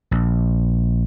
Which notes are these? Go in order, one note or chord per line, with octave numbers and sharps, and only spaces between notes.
A#1